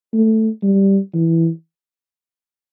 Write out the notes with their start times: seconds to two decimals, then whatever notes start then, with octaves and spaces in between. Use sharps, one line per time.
0.13 A3
0.63 G3
1.14 E3